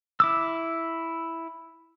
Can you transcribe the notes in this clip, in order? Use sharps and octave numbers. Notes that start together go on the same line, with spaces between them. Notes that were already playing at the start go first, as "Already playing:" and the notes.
E4 D6 E6